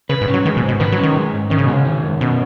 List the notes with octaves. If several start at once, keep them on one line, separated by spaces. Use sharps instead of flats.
C#3 B4
G#2
C#4
F#3
D#3 G#3
B2
G#2
B2
D#3 B4
F#3
C#4
D#3
G#3
G#2
D#3 C#4
C#3
B2 G#3
C#3
D#3
F#2
B2 C#4